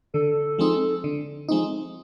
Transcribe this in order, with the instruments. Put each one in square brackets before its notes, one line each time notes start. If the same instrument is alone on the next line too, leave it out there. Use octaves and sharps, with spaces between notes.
[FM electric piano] D3 [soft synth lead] A4
[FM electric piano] F3 G#3 C4 D#4
D3
F3 G#3 C4 D#4